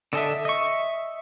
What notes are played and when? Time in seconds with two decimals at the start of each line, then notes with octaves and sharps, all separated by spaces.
0.13 D3 A4 D#5 E5 A5 E6
0.45 D#5 C#6